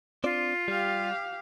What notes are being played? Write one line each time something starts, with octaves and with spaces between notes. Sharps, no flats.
C4 D4 F4 D5
G3 G4 F5